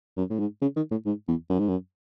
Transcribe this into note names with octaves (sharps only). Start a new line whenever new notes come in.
F#2
A2
G#2
C#3
D#3
A2
G#2
E2
F#2
G#2
F#2